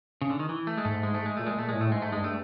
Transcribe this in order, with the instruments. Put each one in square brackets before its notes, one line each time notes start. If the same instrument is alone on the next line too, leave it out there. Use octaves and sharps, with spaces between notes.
[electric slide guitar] C#3
D3
D#3
E3
A3
G#3
[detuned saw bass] G#2 [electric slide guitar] A3
[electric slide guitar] G#3
A3
G#3
[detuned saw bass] A#2 [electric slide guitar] A3
[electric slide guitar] G#3
[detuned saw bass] A#2 [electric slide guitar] A3
[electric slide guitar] G#3
[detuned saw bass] A2
[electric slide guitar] A3
[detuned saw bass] G#2 [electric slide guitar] G#3
[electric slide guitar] A3
[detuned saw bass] G2 [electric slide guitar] G#3
[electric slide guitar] A3